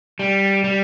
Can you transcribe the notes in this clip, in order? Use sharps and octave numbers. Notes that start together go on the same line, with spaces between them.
G3
G3